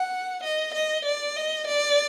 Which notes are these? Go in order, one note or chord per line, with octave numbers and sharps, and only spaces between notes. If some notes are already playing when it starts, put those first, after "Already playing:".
Already playing: F#5
D#5
D#5
D5
D#5
D5